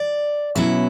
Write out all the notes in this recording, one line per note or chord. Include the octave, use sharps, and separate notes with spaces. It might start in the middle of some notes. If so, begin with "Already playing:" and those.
Already playing: D5
B2 F#3 C#4 E4 E5